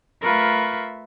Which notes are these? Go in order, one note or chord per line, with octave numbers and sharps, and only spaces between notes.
A3 F4 A#4 B4 E5 C#6